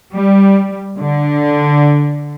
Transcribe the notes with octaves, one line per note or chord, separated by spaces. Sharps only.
G3
D3